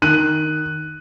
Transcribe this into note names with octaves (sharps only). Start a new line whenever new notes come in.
D#3 F#6 D#7